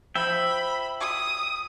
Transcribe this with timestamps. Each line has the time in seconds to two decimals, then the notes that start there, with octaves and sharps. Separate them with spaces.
0.15 F3 E5 G5 B5
1.00 D#6